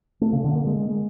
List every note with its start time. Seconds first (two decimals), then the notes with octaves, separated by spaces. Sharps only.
0.21 A3
0.33 C#3
0.44 D3
0.55 A#3
0.67 G#3